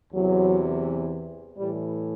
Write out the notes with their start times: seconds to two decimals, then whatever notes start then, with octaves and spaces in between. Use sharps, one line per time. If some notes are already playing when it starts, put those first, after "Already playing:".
0.13 E2 C3 E3 F#3
1.57 A2 E3 G3